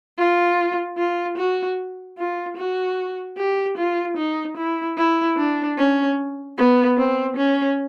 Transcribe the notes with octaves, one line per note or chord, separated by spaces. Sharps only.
F4
F4
F#4
F4
F#4
G4
F4
D#4
E4
E4
D4
C#4
B3
C4
C#4